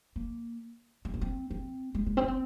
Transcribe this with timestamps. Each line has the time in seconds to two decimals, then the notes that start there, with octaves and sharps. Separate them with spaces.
0.16 A#3
1.05 C4
1.14 C#4
1.21 C4
1.51 C4
1.95 G#3
2.06 G#3
2.17 C4
2.24 C#4
2.28 C4